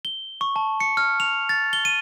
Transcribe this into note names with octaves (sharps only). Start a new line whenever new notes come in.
G7
C#6
A5
C#7
F6
F7
A6
G7
D#7